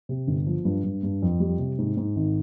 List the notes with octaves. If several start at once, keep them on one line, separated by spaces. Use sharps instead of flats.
C3
G1
F3
G2
G2
G2
F2
G3
C3
G#2
G#2
G#1